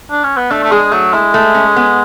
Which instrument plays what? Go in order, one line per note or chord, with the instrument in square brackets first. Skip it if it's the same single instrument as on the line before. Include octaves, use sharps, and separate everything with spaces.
[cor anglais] D4
C#4
B3
[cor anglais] A3 [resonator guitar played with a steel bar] D4
[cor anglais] A3
[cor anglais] G#3 [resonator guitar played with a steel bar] G#4
[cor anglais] F#3 [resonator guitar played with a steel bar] A3
[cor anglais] G#3 [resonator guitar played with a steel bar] E4
[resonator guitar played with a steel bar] A3
C#4
B3